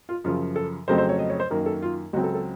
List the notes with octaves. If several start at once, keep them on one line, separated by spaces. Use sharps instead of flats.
F4
F#2 C#3 F3 F4
A4
F2 C#3 F#3 A3 C4 C5
C5
C#5
D#5
C#5
C5
F#2 D#3 A#3 A#4
A4
F4
C#2 C#3 F#3 C4 F#4
A4
A4